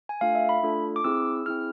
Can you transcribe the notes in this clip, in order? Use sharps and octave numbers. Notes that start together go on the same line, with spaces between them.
G#5
A3 D4 F4 A4 F5
E5
B5
A3 D4 F4 A4
D6
C4 E4 G#4 E6
C4 E4 G#4 F6